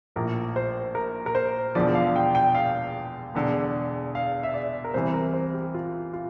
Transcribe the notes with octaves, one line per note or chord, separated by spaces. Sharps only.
A#1 A2 F3 A#4
C5
A#4
A#4
C5
E1 E2 D3 F3 D5
F5
G5
G5
F5
E1 E2 D3
F5
E5
D5
A#4
C2 C3 E3 C5
A#4
C5
G4
F4
F4